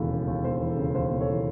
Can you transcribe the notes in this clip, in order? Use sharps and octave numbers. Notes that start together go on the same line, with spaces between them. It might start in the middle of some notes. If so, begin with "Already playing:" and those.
Already playing: E1 D#2 C#3 E3 A4
C#3
D#2
E1 C5
E3
A4
C#3
D#2 C5
E1
A4 C#5
E3